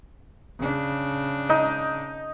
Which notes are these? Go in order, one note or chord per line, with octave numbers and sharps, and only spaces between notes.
C#3 D4
D#4